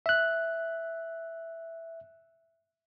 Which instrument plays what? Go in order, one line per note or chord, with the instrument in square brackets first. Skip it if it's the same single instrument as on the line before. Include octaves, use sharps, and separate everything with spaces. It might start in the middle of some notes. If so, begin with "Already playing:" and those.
[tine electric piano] E5 F#6